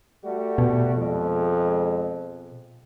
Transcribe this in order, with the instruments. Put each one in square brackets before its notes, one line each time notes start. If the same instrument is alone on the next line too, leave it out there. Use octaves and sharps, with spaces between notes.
[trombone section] G3 A3 F#4
[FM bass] B2
[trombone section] F2 G#3